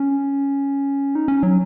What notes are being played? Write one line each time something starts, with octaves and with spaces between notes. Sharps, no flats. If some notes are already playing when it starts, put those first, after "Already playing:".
Already playing: C#4
D#4
C#4
F#3